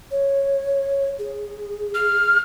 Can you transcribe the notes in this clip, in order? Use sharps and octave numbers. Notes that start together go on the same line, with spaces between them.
C#5
G#4
F6